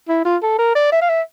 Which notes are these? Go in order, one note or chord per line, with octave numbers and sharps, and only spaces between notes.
E4
F4
A4
A#4
D5
E5
F5
E5